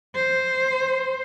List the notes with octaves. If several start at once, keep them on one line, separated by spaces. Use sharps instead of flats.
C5